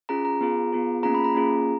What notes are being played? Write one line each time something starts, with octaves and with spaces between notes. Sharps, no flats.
C#4 F4 G#4 A#5
A#5
B3 F4 G#4
B3 F4 G#4
A#3 C#4 F4 G#4 A#5
B5
A#5
A#3 C#4 F4 G#4